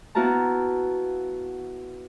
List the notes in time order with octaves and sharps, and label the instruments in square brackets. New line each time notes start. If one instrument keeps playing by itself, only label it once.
[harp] B3 E4 F#4 F5 A5 A#5